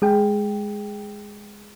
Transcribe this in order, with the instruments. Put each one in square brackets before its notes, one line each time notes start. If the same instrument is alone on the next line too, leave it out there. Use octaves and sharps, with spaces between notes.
[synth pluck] G#3 G#4 G5